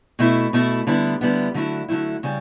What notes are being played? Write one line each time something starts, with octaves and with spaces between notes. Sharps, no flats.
B2 A3 E4
B2 A3 E4
D3 G3 B3 E4
D3 G3 B3 E4
D3 F#3 A3 E4
D3 F#3 A3 E4
C#3 G3